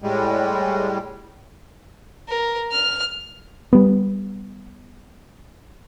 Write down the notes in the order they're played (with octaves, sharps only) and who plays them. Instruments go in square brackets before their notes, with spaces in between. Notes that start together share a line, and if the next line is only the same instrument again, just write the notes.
[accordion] A2 G3 G#3
[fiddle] A#4
F6
[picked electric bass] G3 B3